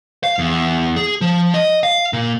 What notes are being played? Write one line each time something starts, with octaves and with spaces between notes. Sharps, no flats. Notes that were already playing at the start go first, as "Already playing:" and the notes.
F5
E2
G#4
F3
D#5
F5
A#2